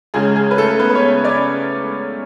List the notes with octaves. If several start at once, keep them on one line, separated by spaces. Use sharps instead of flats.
C#2 C#3 G#3 G#4
G#4
B4
A3 A4
B3 B4
B4
C#4 C#5
D5
C#4 C#5